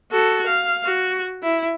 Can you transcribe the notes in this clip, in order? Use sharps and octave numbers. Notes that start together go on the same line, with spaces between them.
F#4 A4
F5
F#4
E4